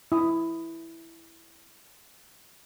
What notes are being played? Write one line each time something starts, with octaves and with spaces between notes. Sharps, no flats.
E4 D#6